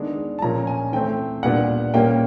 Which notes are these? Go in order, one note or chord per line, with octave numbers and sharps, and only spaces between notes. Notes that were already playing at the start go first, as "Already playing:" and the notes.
Already playing: D#3 G#3 B3 D4
A5
A#2 F3 A#3 C#4 A#5
G#5
E3 A3 C4 G5
A#2 G3 B3 D4 F#5
A#2 G3 A#3 C#4 G5